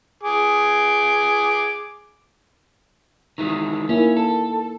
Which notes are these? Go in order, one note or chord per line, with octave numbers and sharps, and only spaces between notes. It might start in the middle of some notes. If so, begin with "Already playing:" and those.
G#4 D6
D#3 E3 G#3
A#3 C#4 D#4 E4
A4